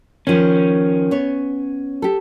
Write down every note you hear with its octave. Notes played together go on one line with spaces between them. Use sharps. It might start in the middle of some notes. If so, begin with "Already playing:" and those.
D#3 F3 C#4
B3 C#5
G4 A4